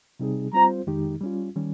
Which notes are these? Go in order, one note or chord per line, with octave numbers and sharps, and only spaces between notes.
C3 G3 C4 D#4 G#4
G3 C4 F4 C5 A#5
F2 D#3 G#3 D#4 G4
G3 C#4 F4
D#3 G3 C#4